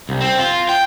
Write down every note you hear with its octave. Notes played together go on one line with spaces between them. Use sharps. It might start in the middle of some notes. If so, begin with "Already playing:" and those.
C2
C4
F4
G5